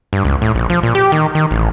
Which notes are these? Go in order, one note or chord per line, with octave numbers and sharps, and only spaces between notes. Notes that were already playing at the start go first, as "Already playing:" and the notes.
G2
C#2
A2
A#1
F3
A#2
G4
D#3
D#3
A1